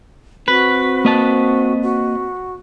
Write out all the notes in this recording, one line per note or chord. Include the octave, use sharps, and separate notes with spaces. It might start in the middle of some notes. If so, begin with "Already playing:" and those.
C4 F#4 B4
A#3 D#5 A5
F#4